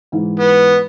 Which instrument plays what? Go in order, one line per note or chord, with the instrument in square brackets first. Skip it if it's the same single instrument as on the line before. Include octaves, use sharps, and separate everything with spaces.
[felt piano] G#2 E3
[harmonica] B3